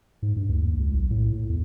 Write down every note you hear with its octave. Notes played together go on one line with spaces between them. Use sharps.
G#2
G2
D2
D#2
C#2
B1
A2
A2
E2